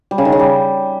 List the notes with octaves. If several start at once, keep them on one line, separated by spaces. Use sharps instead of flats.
G3
C#3
D#3
C#3
G3